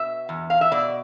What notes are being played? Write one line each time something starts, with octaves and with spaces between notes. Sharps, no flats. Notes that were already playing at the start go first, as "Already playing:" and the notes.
Already playing: B2 E5
E2
F5
E5
B2 D5